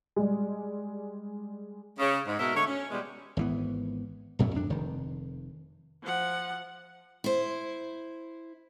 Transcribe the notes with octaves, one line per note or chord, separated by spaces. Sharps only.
G3 G#3
C#3
G#2
B2 G#3 F#4 A#4 E5
D3 G#3 A3 C#5
C#4
B2 E3 G3 G#3
G#1 E3 B3
A#1 F#2 B2 A3
F2 D4
F1 D#3
F3 F#5
E4 C5